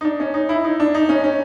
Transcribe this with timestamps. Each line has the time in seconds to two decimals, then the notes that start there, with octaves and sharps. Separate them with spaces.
0.01 D#4
0.05 D4
0.20 C#4
0.34 D#4
0.49 E4
0.64 D#4
0.80 D4
0.95 D#4
1.09 C#4
1.24 C#4